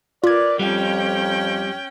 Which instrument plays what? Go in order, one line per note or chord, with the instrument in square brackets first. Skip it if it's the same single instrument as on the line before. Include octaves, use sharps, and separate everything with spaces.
[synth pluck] F4 G#6 [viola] A#4 B4 [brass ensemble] D5
[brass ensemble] F2 [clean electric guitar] G3 [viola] C#4 G5